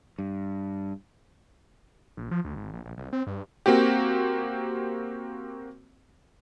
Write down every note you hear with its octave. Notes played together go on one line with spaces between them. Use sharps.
G2
A#1
F3
D2
G#1
A#1
A#1
C2
C4
G2
A#3 C4 F#4 G4